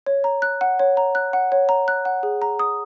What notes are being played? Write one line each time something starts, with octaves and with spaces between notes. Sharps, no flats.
C#5
A#5
F#6
F#5
C#5
A#5
F#6
F#5
C#5
A#5
F#6
F#5
G#4
A#5
D#6